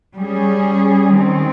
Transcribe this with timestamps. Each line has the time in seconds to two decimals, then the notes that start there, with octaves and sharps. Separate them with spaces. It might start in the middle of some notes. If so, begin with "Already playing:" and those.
0.17 G3 C#4 G#4
1.16 D#3 G#3 C4